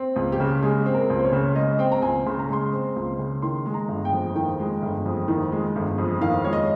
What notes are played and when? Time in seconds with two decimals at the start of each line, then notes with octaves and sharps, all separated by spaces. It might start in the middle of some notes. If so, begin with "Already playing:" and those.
Already playing: C4
0.16 C#2
0.32 G4
0.40 C#3
0.63 G#3 G#4
0.86 C4
0.94 A#4
1.10 C#2
1.19 C5
1.25 C#5
1.32 C#3
1.56 G#3 D#5
1.79 C4 G5
1.92 A#5
2.02 C#2 G#5
2.26 C#3 C6
2.39 A#5
2.49 G#3 C6
2.73 C4
2.96 C#2
3.19 C#3
3.42 D#3 C6
3.66 G#3
3.74 A#5
3.88 G1
4.05 G5
4.13 F2
4.35 D#3 G5
4.59 G#3
4.82 G1
5.06 F2
5.28 D#3
5.52 G#3
5.76 G1
5.98 F2
6.21 D#3 F5
6.44 G#3 C#5
6.53 D#5